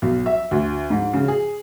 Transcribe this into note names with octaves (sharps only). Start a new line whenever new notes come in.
B1
E5
D2
G#2
C#3
G#4